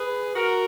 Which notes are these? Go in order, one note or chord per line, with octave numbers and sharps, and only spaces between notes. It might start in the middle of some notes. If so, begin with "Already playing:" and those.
Already playing: G#4 B4
F#4 A#4